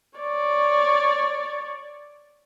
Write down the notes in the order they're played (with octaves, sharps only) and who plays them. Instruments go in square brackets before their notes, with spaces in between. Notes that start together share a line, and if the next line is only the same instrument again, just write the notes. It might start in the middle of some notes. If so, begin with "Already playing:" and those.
[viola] C#5 D5